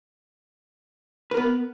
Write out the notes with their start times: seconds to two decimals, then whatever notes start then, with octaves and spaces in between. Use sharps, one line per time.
1.31 B4
1.34 A#4
1.37 B3